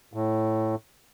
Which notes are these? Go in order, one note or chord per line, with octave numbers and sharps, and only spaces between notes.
A2